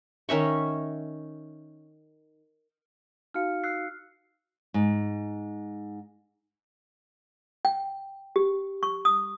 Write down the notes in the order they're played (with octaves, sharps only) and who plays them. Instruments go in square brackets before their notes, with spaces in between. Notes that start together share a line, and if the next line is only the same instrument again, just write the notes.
[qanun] D#3 C#4 E5 C#6
[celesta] D#4 F#4 F5 [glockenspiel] F6 C#7
[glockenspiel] E6 F#6 C7
[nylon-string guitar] G#2
[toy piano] G5
G4
C#6
D#6